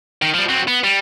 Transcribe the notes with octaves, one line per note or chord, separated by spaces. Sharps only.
D#3
F3 G3
F#3 C4
B3
G3